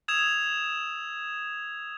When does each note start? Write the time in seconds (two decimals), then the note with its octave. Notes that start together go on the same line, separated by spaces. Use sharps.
0.08 D#6 E6 G#6 E7 F7